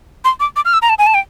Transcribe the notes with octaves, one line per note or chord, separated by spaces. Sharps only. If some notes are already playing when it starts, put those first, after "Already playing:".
C6
D6
D6
F6
E6
A#5
A5
G#5
A5
G5